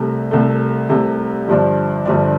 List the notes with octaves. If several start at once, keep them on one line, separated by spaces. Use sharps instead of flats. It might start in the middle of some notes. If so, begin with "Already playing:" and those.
Already playing: C2 C3 A3
C2 C3 A3
C2 C3 A3
G1 G2 F3 D4
G1 G2 F3 D4